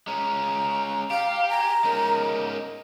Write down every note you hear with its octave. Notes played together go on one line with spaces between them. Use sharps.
G#3 C#4 A#5
G4 F5
G#5 A#5
G#3 C#4 D#4 A#4